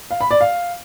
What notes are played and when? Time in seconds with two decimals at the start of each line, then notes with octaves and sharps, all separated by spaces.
0.11 F5
0.21 B5
0.31 D5
0.41 F5